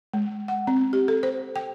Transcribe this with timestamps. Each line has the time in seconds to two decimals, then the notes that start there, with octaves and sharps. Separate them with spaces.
0.14 G#3
0.48 F#5
0.67 C4
0.93 G4
1.08 A4
1.23 C5
1.56 G5